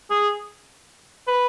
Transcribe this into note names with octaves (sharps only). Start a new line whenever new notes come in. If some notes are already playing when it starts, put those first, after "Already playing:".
G#4
B4